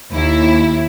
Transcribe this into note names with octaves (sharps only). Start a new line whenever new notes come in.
D#2 E4